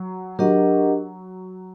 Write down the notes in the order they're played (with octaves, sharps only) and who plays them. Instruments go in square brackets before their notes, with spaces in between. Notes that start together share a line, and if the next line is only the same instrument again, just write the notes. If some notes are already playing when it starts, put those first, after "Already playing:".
Already playing: [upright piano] F#3
[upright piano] F#3 [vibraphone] D4 G4 A#4 D#5 F#5